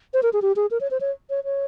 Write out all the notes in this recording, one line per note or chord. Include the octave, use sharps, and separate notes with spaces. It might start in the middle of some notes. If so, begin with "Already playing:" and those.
C5
A#4
G#4
G4
G#4
A#4
C#5
C5
C#5
C#5
C#5